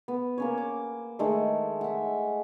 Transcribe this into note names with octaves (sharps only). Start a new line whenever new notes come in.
B3
A#3 C#4 C#5
D6
D#3 G#3 A3
E5 F#5